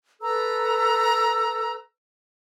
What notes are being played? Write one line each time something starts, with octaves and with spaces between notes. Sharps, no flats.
A4 B4 A#5 E6